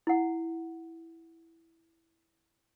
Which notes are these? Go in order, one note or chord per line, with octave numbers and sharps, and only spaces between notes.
E4 F#5